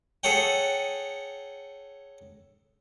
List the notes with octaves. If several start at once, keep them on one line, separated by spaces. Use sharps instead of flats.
G#4 A4 C#5 F#5 G5